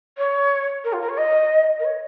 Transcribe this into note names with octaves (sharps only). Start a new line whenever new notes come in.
C#5
A#4
F4
A#4
C#5
D#5
A#4
C#5